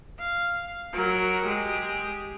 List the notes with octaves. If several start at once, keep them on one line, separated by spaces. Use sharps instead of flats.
F5
F#3 A#4
G#3 G4